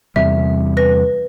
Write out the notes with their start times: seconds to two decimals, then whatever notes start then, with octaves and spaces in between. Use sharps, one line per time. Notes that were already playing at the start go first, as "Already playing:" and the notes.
0.16 E2 C3 G3 E5
0.77 B4 A#6